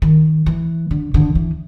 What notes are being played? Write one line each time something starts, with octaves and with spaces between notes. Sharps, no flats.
D#3
E3
D3
D3
E3